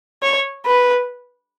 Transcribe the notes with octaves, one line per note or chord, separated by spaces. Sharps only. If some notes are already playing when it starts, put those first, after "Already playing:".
C#5
B4